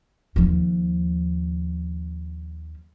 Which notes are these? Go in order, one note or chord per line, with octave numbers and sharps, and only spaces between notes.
D#2 F3